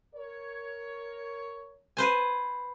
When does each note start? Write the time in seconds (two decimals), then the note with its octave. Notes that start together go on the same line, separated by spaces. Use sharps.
0.15 A#4 C#5
1.97 B4 C5 G#5